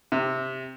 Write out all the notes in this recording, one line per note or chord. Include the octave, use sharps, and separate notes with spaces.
C3